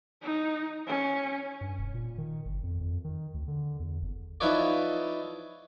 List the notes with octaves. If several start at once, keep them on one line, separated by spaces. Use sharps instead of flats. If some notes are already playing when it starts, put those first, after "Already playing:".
D#4
C#4
G2
E1
A#2
D#3
G1
F2
F2
D#3
D2
D3
E2
F#1
F3 D#4 E4 B4 C#5 D5